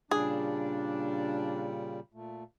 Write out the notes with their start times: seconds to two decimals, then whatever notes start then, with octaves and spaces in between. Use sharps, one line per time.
0.11 A#2 C#3 G3 D4 G#4
2.14 A#2 A3